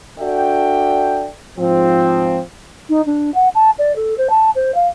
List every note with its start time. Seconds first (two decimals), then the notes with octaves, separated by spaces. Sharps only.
0.19 D4 F#4 A4 D5 E5 G5
1.57 G#2 F3 C4
2.89 D#4
3.06 D4
3.34 F#5
3.54 A5
3.79 D5
3.96 A4
4.17 C5
4.30 A5
4.55 C5
4.75 F5